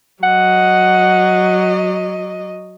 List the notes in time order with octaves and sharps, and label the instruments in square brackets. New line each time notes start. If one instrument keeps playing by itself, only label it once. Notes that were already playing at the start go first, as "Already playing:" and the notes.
[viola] F#3 D#5 [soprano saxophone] F#5